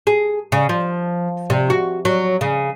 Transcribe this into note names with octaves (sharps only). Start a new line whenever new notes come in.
G#4
C#3
F3
C3
F#4
F#3
C#3